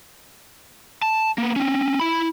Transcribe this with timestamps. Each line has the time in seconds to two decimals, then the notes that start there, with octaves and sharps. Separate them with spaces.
1.02 A5
1.38 A#3 B3
1.56 C4 C#4
2.00 E4 B5